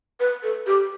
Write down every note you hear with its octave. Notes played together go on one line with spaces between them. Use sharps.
B4
A4
G4